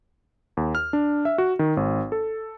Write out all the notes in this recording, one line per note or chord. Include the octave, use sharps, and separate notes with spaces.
D#2
F6
D4
E5
F#4
D#3
G#1
A4